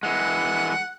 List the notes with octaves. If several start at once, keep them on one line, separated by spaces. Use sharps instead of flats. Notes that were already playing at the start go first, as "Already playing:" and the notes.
E3 G#3 F#5